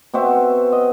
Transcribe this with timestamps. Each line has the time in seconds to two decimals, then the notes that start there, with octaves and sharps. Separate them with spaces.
0.14 B2 C4 F#4 E5
0.72 D#5